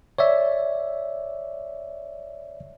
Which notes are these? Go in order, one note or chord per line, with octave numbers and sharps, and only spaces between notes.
C#5 D5 E5